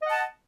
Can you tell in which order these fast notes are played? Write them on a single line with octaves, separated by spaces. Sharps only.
D#5 F#5 A5